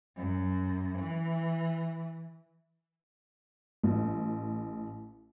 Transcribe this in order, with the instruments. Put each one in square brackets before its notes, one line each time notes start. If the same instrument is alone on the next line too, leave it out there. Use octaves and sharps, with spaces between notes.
[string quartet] F#2
E3
[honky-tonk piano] A1